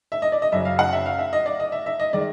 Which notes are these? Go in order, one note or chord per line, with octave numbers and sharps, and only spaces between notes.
E5
D#5
D5
D#5
F#2 C#3 F#3 E5
F5
F#5
E5
F5
E5
D#5
D5
D#5
E5
E5
D#5
D#3 G#3 D5